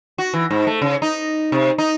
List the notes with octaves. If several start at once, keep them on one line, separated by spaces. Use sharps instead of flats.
F#4
E3
G#2
A3
C#3
D#4
C3
D#4